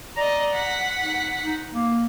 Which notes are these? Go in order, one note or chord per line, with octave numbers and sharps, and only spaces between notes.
D5 D#5 A#5
F#5 B6
D#4
D#4
A#3